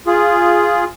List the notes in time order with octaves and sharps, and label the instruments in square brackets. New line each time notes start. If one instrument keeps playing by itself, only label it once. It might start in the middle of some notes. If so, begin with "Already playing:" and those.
[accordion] F4 G#4